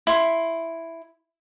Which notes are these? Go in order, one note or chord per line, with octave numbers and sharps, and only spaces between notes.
E4 C6